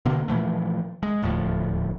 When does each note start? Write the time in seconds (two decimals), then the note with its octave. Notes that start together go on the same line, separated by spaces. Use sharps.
0.05 B2 D3 A#3
0.28 A#2 E3 F3 A3
1.03 G#3
1.22 D#1 D2 A2 F3